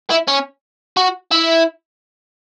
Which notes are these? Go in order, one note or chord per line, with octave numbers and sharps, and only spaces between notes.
E4
C#4
F#4
E4